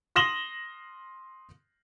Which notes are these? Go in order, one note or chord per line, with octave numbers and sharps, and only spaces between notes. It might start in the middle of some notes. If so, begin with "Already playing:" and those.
C6 D#6 A#6 E7 F#7 G7